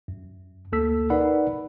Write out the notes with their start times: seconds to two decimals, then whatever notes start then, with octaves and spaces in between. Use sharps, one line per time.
0.08 F#2
0.72 D2 A#3 A4 E6 B6
1.10 D#4 A#4 B4 D5 F#5 B5